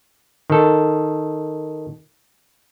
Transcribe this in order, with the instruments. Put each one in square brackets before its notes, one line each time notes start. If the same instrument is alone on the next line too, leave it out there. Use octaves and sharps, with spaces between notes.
[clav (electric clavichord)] D#3 A4